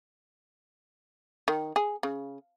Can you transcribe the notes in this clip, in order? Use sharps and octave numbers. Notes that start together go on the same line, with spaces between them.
D#3
G#4
C#3